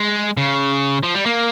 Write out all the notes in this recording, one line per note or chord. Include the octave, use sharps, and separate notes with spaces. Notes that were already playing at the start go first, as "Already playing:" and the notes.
Already playing: G#3
C#3
F3
G3
A#3